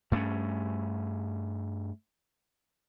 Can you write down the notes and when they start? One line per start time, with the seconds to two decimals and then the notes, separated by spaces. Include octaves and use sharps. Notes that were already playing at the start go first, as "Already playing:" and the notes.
0.12 G2 A3 C4 C#4